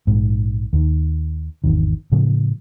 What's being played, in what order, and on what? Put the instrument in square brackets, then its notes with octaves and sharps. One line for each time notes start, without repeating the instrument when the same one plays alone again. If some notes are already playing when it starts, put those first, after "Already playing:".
[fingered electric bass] A#1 G#2
D#2 D#3
G#1 E2 D#3
A2 C#3 F3